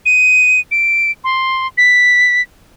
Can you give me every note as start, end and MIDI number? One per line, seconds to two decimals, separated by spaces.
0.06 0.60 99
0.71 1.11 98
1.24 1.67 84
1.78 2.42 95